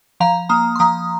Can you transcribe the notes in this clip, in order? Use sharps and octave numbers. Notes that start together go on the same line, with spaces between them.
F3 F5 A#5
A#3 A#5 D#6
C6
F3 A#5 D#6